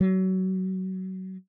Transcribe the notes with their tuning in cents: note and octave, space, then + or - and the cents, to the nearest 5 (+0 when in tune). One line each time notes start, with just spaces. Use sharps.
F#3 +25